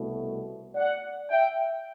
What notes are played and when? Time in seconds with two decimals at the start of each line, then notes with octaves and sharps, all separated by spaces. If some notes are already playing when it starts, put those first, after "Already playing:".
Already playing: C2 B2 A3
0.75 D5 F#5
1.30 E5 G5